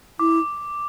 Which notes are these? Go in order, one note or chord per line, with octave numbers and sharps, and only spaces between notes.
E4 D6